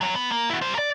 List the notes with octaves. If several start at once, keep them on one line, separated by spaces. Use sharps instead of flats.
F#2 F#3
B3
A#3
E4 F#4
G3 C5
A#4 D5